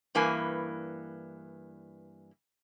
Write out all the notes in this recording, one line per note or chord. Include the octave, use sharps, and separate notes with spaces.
G2 E3 A#3 B4 G#5